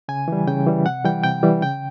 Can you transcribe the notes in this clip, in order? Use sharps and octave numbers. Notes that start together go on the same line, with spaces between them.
C#3 G#5
E3 G3
C#3 G5
E3 G3
C3 F#5
E3 G3 G5
C3 G5
E3 G3
C#3 G5